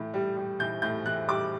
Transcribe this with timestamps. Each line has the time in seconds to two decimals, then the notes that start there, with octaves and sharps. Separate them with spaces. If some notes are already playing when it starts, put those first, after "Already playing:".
Already playing: A2 E3
0.14 G3
0.37 G3
0.59 E3 G6
0.82 A2 G6
1.06 E3 F#6
1.28 G3 D6